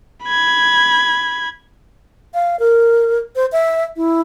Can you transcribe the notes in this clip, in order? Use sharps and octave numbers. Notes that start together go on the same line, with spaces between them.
B5 G#6
F5
A#4
C5
E5
E4